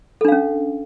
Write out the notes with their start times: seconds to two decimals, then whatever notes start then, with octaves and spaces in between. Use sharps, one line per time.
0.21 A4
0.25 D4
0.28 F5
0.32 C#4